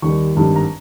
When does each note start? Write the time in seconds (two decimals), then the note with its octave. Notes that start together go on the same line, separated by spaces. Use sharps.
0.02 D#2 D#3 G3 C#6
0.35 G#1 G2 D#3 F#3
0.56 A#5